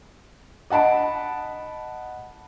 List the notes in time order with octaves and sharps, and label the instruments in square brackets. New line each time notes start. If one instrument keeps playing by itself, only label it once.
[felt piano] D#5 F#5 A5 B5 D7